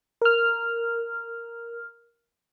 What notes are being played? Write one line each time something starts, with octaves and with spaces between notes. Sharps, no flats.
A#4 F6